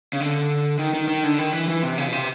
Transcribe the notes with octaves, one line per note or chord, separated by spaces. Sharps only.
C#3
D3
D#3
D#3
D#3
D3
D#3
E3
E3
C3
C#3
B2
C3